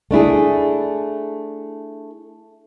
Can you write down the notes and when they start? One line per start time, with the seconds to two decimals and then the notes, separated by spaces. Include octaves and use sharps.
0.11 A3 D4 E4 G#4